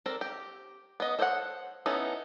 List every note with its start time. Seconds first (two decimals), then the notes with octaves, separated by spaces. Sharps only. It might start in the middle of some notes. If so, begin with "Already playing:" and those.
0.06 C4 D4 A4 A#4
0.21 G4
1.00 B3 D#5
1.19 A4 C5 C#5 D#5 F#5
1.86 B3 C#4 D#4 E4 A4